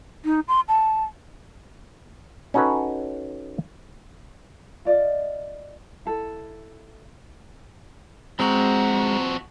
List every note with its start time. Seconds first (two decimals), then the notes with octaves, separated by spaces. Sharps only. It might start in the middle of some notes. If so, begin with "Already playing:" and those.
0.25 D#4
0.48 C6
0.68 A5
2.54 C#4 D#4 F#4 A4 B4 C#5
4.85 F4 D5 D#5
6.05 E4 A4
8.39 F3 G#3 C4 F#4 A#5